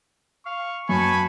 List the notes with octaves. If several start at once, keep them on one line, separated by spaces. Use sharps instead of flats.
F5 C#6
F#2 B3 G#5 A5 B5 C#6